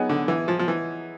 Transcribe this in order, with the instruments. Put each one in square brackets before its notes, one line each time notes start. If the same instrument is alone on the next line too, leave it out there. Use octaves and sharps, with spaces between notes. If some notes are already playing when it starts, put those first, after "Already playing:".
Already playing: [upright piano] F#3 B3 D#4 G#4
[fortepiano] D3
E3
F3
F3
E3